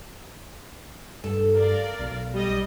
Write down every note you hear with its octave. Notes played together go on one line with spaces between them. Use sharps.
G2 A4
A#4 D5 F5
B1
G3 D#5